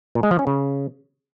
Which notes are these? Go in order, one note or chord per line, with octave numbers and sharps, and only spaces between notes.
A#2
G#3
F3
C#4
C#3